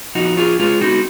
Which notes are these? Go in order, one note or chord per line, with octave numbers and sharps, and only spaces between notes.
F3 D#4 F#4
F4 G#4
G#3 F4 G#4
D#4 F#4